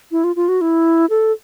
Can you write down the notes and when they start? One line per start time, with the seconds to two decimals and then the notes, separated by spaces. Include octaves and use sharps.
0.12 E4
0.24 F4
0.36 F4
0.48 F#4
0.61 E4
1.10 A4